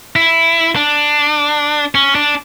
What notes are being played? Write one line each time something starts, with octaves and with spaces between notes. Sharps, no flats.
E4
D4
C#4
D4